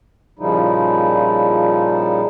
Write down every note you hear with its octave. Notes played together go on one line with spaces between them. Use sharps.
A#2 C#3 F3 G3 D#4 E4